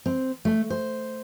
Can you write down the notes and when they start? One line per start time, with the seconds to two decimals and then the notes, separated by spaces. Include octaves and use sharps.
0.06 C4
0.45 A3
0.70 C5